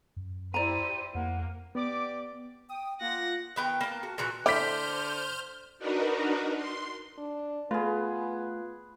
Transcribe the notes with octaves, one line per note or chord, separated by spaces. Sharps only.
F#2
E4 G4 C5 D5 A#5 D#7
F2 A#3 F#5
B3 G4 D5 D6
G5 D#6
A#3 F4 F#5 A#6
D#3 B3 G5
A#3 A5
F#4
A#2 E3 F#4 A#5
D3 A3 E4 C5 D6 F6 G6 B6
D4 D#4 F#4 A#4 B4
C6
D4
A3 B3 F4 G#4 B4